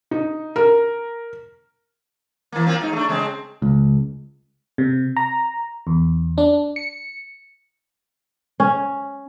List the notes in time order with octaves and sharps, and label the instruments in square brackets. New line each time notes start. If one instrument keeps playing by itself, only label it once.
[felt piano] D#4
A#4
[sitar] E3 A#3
A#3 C4 F4
G#2 D#4
A3 D4
C#3 G#3 C4
[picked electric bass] C#2
[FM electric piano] C3
A#5
E2
D4
C#7
[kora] C#4